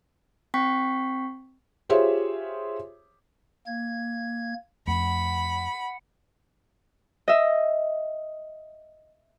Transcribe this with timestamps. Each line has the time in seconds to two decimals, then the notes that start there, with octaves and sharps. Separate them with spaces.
0.54 C4 G5 C#6 B6 C7
1.89 F4 G4 G#4 C5 C#5 E5
3.67 A#3 G#6
4.87 F2 A3 F#5 B5
7.28 D#5 E5